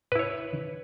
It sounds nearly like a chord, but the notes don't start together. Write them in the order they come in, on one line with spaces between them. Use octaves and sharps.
B4 E4 C#5